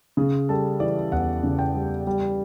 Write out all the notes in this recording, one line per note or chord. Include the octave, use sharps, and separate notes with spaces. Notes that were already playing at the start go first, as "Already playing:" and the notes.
C#3 G#4
G3 A4
E3 D5
E2 F#5
C#3
G5
G3
G3